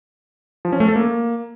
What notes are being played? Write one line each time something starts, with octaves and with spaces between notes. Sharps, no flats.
F3
C#4
A3
A4
A#3